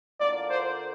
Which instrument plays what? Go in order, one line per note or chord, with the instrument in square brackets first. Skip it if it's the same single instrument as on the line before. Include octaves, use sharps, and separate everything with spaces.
[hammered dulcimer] D3 A#3 F4 [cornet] D5
[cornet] C5